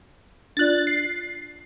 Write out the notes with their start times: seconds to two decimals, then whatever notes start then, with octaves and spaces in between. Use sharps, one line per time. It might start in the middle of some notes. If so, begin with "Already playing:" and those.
0.57 D4 F4 D5 F#6 A6
0.87 C7